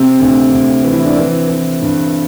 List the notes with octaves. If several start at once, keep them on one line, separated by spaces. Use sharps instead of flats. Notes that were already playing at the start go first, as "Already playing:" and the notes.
Already playing: C3 C4
D2
D2
E3
E4
D4
E3 C4
E3
G2